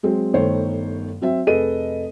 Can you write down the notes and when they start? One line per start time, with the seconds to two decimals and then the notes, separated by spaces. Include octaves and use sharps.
0.03 F#3 G#3 C4
0.34 G1 D#3 A3 C5 C#5
1.21 F#3 C4 E5
1.47 F1 G#4 A4 B4 D#5 D#7